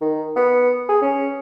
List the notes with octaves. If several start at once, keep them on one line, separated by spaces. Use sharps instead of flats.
D#3
B3
G#4
C#4